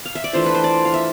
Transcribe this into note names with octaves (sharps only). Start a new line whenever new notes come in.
F5
E5
D5
E3 A3 D4 F4 C5
B4
C5
D5
F5
E5